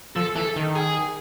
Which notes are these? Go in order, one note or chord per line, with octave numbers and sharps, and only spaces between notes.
F3 A4
E3 A4
D#3
G#4